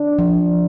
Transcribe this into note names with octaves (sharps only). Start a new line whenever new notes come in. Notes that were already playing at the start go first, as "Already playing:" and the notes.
Already playing: D4
F3